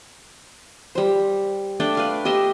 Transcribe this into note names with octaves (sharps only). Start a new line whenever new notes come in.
G3 C5
A3 D4 D5 G5
B4 F5 C6
G4 D#5 E5 C6